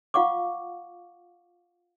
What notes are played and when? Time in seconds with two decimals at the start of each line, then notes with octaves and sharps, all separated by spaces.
0.14 F4 F5 F#5 C#6 D6